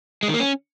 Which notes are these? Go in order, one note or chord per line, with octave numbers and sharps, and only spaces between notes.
G#3
D#3
A#3
C#4